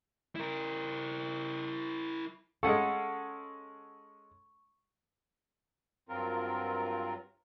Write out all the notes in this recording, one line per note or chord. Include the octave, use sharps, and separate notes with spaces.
E4 A#4
G#3 C#4 A4 F5 F#5 C#6
G2 F#3 C4 F4 A#4